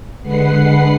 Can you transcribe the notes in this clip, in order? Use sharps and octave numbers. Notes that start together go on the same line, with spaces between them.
D3 G#3 B4 F#5 C7